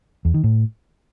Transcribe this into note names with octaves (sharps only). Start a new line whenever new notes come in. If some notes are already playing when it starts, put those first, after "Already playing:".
E2
D#3
A2